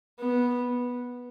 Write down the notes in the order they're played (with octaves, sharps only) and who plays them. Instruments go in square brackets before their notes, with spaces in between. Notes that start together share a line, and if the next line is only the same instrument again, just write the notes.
[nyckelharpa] B3